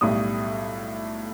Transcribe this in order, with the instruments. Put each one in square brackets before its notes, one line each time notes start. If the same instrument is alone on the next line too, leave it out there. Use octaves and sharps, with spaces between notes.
[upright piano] B1 A2 G3 D#6